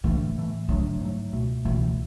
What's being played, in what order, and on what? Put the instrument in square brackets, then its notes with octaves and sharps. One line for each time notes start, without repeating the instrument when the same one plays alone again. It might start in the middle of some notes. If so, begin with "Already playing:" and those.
[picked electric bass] A2 E3 A3 [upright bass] D3
[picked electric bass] A2 E3 A3
[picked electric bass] G#2 F#3 A3 [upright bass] D3
[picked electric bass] G#2 F#3 A3
C#2 B2 A3
[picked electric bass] C#2 B2 A3 [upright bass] E3